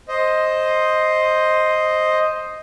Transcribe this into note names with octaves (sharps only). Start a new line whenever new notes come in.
C5 D#5